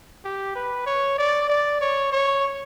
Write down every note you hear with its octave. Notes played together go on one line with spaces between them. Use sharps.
G4
B4
C#5
D5
D5
C#5
C#5